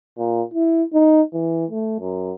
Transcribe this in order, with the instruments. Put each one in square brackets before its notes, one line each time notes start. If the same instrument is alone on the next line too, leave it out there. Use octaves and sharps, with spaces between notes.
[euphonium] A#2
E4
D#4
E3
A3
F#2